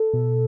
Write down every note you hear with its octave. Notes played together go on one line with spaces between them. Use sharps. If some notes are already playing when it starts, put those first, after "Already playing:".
Already playing: A4
B2